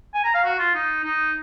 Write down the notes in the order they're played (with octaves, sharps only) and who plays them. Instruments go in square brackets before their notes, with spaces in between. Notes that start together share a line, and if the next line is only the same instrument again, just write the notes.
[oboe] G#5
A#5
F5
F#4
F4
D#4
D#4